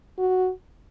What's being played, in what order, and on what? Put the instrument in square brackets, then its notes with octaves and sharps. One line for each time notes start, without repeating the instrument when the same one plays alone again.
[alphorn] F#4